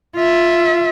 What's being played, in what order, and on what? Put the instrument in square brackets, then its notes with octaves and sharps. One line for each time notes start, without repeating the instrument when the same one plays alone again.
[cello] F4 E5